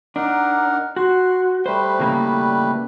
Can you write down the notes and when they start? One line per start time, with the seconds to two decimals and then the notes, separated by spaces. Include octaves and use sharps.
0.16 D4 D#4 A#4 F#5
0.96 F#4 C6
1.66 G3 A3 B4 C5
2.00 A2 C#3 A#3